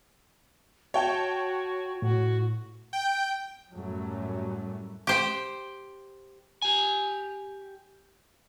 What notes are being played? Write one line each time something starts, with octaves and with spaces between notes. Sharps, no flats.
F#4 C#5 G5 A5
A2 F#4
G5
F#2 A2 F#3 G3 A3 C#4
G4 C5 G5
G4 G#5